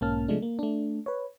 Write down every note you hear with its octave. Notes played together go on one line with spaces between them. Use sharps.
B1 G#2 A#3 C#4 A5 F6
C3 F3 G#3 A3 D4
A#3
A3 D4
B4 C#5